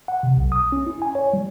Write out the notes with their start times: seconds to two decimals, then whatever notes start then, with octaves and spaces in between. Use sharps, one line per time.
0.08 F#5
0.23 C3
0.37 B1
0.52 D#6
0.72 C#4
0.87 E4
1.02 G#5
1.15 C#5
1.33 G3